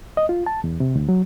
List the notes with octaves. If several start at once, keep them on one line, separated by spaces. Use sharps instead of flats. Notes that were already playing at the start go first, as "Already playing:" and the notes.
D#5
F4
A5
E2
C3
D2
F#3